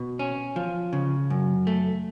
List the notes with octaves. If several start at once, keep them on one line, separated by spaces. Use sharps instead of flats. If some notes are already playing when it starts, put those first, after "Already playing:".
Already playing: B2
C#4
F3
C#3
F#2
A3